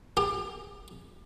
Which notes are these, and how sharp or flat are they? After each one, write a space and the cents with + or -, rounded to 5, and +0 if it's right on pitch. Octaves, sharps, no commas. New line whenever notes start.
G4 +30